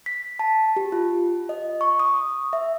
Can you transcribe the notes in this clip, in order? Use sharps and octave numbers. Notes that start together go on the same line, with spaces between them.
B6
A5
G4
F4
D#5
C#6
D#6
E5